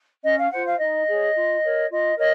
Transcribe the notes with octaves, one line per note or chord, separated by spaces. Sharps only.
C#4 D#5
F5
F4 C5 F#5
F5
D#4 D#5
G#4 C#5
F4
A#4 C#5
F4 D#5
A#4 C#5 D#5